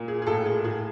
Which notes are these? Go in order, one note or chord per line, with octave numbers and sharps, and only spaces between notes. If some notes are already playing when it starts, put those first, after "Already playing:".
Already playing: A#2
G#4
G#4
A2 A4
G#4
A2 G#4